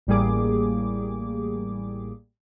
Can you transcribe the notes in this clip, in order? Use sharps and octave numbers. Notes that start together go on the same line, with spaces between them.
A1 A2 G3 A#3 G#4 D6